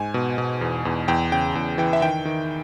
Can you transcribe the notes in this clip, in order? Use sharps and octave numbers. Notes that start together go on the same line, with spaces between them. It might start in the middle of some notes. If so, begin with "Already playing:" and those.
Already playing: G#2 G#5
B2
B2
E2
E2
E2 G5
C#3 G5
E2
E3 G5
E5
D#3 G5
D#3